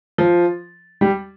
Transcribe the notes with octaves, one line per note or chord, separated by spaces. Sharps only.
F3
G3